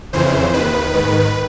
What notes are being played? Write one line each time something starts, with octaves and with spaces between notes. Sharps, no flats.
F2 C#3 E3 C5
D#2 D#3 B4
G#2 D#3